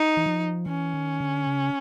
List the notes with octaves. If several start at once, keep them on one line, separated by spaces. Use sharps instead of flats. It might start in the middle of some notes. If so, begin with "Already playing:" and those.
Already playing: D#4
E3
F3
E3 C#4
D#3
D3
C#3